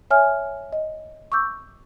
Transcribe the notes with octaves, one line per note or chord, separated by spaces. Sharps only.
C#5 E5 G#5 F6
D#5
C#6 D6 E6 G6